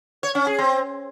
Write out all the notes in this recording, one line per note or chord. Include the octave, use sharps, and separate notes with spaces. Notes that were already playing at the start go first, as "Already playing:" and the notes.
C#5
C#4
G#4
C4